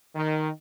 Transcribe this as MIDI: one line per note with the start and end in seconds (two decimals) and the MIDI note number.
0.15 0.50 51